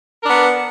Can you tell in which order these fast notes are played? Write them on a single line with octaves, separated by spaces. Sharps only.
A#4 D4 B3